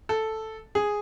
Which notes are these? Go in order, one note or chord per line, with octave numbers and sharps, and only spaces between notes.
A4
G#4